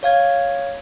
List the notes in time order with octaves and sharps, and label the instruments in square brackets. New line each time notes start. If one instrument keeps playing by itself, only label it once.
[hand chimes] C#5 F5 G#6